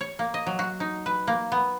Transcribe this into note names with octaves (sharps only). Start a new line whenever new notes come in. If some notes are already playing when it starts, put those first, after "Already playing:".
C#5
A#3
D#5
F#3
F#4
D#4
B4
A#3
B3